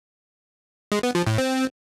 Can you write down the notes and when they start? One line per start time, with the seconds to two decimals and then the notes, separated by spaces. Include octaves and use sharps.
0.92 G#3
1.03 B3
1.15 F3
1.27 A2
1.38 C4